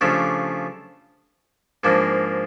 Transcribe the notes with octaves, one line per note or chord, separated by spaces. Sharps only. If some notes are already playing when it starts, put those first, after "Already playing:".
C#3 F3 A3 D4 G4
G#2 F3 A#3 D4